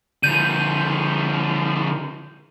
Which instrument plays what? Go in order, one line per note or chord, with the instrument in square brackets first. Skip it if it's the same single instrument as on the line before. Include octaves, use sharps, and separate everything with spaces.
[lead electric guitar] D3 F3 [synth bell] G6 D#7